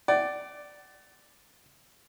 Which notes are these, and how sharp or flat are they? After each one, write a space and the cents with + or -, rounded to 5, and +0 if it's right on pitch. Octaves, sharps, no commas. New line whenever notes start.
D5 +0 F#5 +40